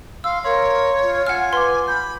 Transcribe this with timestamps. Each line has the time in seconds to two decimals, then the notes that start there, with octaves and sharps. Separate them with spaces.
0.24 F5 C6 E6
0.44 A#4 C#5 F5 C6
1.02 F4
1.27 F#5 G#5 F6
1.53 B4 F#5 C6 D6
1.88 B5 G6